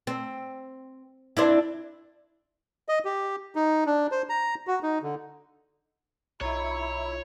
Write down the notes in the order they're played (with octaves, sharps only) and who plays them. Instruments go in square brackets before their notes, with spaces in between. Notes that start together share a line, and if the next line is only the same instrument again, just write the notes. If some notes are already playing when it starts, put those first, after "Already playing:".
[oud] C4
C4 D4 E4
[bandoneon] D#5
G4
D#4
D4
C5
A#5
F#4
D#4
D3
[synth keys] B1 F4 D#5 [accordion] E4 [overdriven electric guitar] C#5 [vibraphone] A#5